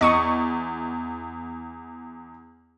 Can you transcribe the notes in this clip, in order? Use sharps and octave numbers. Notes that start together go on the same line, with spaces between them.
E2 D#5 C#6 D#6